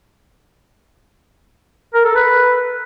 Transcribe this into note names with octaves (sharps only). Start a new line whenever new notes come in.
A#4
A4
B4